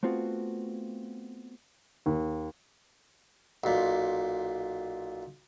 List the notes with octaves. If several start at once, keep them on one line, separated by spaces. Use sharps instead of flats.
A3 B3 C4 F4 F#4
D#2
B1 A#2